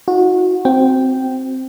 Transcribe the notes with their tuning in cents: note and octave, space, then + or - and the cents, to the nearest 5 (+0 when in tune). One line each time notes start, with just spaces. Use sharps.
D#4 +35 F#4 -25
C4 +0 F#4 +0 G5 -5